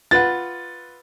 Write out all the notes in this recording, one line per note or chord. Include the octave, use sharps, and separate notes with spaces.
F4 B4 F#5 A6